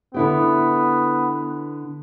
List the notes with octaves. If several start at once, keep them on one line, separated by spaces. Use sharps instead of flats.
D3 B3 E4 G4